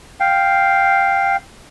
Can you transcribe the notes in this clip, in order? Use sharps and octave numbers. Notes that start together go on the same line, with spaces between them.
F5 G5